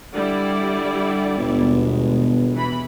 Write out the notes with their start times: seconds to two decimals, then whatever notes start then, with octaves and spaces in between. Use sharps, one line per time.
0.14 D3 G3 E4 D5
1.38 G1 D#2 B2 G#3
2.53 E3 B5